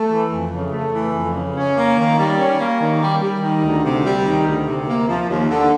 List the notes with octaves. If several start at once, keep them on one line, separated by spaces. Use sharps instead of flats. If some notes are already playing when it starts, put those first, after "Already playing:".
Already playing: A3
E3
F2
C#3
A3
E3
F2
C#3
C#4
A#3
D#3
G3
C#4
A#3
D#3
G3
G3
D#3
D2
C3
G3
D#3
D2
C3
A#3
F3
D#2
D3